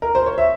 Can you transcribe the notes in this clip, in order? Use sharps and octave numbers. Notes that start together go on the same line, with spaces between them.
A#4
C5
C#5
E5